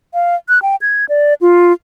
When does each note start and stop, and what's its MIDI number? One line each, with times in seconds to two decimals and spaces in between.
0.14 0.35 77
0.49 0.62 90
0.62 0.76 79
0.81 1.05 92
1.09 1.34 74
1.41 1.73 65